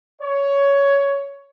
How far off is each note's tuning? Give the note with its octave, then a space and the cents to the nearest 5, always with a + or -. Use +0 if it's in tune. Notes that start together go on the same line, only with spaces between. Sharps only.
C#5 +15